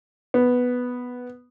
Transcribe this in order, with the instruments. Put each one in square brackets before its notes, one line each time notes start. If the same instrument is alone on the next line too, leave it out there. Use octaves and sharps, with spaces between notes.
[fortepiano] B3